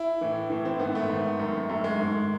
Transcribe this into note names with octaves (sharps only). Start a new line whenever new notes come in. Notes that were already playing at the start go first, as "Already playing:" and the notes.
Already playing: E4
A2 E3
A2 E3
C4
G#2 D#3 B3
A3
G#2 D#3
F#2 D#3
F#2 D#3 A3
G#3
G#2 D#3